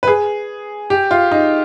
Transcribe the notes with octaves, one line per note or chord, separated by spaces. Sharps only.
B4
G#4
G4
F4
D#4